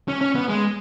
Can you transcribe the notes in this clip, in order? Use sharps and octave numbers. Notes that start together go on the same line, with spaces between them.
C#4
C#4
B3
G#3